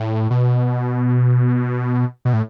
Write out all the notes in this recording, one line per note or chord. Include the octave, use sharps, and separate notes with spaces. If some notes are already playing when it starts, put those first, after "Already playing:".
Already playing: A2
B2
B2
A2